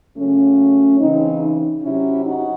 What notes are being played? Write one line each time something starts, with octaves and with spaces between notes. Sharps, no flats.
C#3 F#3 A3 C#4
C#3 E3 C4 D#4
C3 F#3 C#4 E4
D#4 F#4